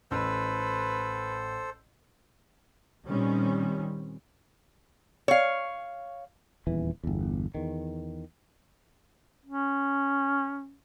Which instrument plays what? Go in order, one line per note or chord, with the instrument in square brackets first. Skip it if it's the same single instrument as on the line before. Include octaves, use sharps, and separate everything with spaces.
[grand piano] A1 E6 [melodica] A4 C5 [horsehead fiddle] B4
[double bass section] A#2 D#3 G3 C4 C#4
[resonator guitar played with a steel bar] C#5 F5
[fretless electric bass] D#1 E2 E3
G1 E2
E2 D#3
[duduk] C#4